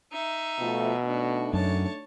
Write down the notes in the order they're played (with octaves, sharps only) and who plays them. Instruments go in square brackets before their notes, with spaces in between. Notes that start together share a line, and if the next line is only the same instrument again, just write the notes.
[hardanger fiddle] D#4 E5
[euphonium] B2 [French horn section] F3 A3 F4
[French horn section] A3 D4 D#4 [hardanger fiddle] F#4
[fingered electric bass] F#2 [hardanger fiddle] C#5 A5